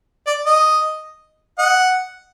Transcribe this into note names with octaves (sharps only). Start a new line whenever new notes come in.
D5
D#5
D#5 F#5